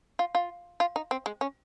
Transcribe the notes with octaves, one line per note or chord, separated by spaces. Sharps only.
F4
F4
F4
D#4
C4
G#3
C#4